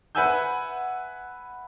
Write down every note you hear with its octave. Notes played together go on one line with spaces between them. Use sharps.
B4 E5 F#5 G#5 E6 G6